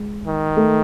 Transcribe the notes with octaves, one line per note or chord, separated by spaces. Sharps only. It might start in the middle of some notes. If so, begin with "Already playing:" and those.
Already playing: G#3
D#3
A3